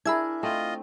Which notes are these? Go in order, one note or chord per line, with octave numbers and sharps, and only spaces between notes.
D4 E4 G#4 A#4 E5 B5 E6 G#6
A3 C4 F4 D#5